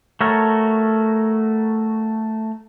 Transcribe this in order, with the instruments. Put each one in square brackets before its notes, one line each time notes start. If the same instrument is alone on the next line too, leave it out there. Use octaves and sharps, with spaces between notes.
[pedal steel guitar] A3 F#4 A4 A#4 C#5